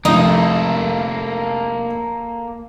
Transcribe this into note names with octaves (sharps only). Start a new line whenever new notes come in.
F1 A#3 D#4 E4 A4